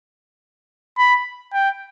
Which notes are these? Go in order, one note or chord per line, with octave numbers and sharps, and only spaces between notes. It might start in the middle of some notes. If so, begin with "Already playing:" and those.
B5
G5